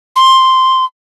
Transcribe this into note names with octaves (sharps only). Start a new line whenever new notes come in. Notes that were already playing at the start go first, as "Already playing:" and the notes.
C6